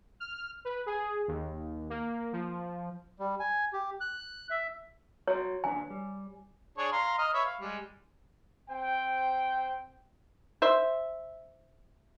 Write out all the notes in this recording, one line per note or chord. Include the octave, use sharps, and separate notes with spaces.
F6
B4
G#4
D#2
A#3
F3
G3
G#5
G4
F#6
E5
F#4 C#5 A#5 C6
D#2 D4 B4 G#5
G3
D4 G#4 C#5
F5 A#5 C6
D#5 F6
B4 C#5 E5
F5
G3 G#3
C4 C5 G5
C5 E5